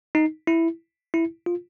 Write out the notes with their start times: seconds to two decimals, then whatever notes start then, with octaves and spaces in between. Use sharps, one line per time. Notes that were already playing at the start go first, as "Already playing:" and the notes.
0.15 D#4
0.47 E4
1.14 E4
1.46 F4